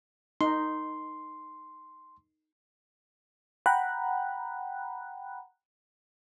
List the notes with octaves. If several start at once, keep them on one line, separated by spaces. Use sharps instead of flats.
D#4 C6
F#5 G5 A#5 B5 F#6